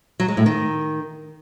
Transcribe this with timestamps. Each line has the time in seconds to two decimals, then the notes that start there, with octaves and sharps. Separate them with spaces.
0.20 F#3
0.28 G#3
0.37 A2
0.46 D#3